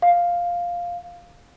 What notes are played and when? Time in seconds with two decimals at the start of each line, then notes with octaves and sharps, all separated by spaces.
0.02 F5